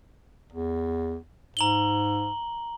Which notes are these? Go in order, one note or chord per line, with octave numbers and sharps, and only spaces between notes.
E2
G#2 A#5 F#7 G7